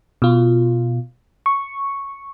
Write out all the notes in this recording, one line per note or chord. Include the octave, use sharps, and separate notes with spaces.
B2 F4
C#6